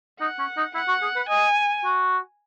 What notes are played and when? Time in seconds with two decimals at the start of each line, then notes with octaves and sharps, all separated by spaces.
0.20 D#4 F#5
0.39 C#4
0.57 D#4
0.74 E4 F#5
0.88 F#4
1.02 G#4
1.16 B4
1.29 D#5 G#5
1.84 F#4